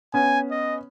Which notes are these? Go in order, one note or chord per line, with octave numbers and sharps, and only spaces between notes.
B3 C#4 G#5
D#5